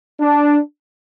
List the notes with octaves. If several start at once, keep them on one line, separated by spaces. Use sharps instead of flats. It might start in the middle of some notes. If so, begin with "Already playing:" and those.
D4